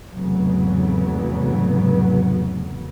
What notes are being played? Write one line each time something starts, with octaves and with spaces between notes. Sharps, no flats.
F1 E2 G#2 C#3 F#3 B3